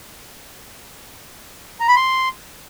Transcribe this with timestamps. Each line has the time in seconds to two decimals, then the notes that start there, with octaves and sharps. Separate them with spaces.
1.80 A#5
1.88 B5
1.96 C6